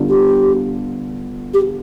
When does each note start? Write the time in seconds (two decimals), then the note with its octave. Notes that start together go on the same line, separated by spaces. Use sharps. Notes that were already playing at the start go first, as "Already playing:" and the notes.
Already playing: D3 G3 B3 D4 F4
0.09 G4
1.54 G4